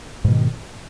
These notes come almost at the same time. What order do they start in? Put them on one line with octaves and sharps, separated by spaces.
G#2 B2 D#3